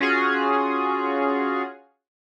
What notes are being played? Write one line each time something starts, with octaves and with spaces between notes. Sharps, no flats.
C#4 F4 F#4 G#4